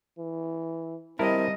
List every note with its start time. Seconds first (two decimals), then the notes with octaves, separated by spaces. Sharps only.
0.18 E3
1.19 G3 C4 E4 A#4 D#5 A5